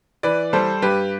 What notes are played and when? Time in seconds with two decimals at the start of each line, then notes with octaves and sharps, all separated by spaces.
0.23 E3 B4 D5
0.53 G3 A4 C5
0.82 G2 G4 B4